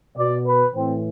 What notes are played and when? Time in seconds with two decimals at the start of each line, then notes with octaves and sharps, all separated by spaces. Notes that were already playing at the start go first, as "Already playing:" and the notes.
0.17 B2 D5
0.46 B4
0.74 A2 E3 C4